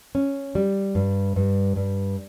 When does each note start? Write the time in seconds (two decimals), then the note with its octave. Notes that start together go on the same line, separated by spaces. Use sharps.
0.15 C#4
0.55 G3
0.95 G2
1.36 G2
1.76 G2